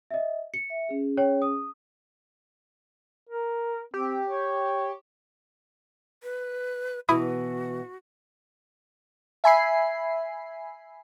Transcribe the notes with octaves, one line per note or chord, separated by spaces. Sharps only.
D#5 E5
C#7
E5
C#4 G#4
C#5 G5
D#6
A#4
C4 G4
C#5
B4
B2 E3 E4 F#4 E5 D#6
E5 G#5 B5 C7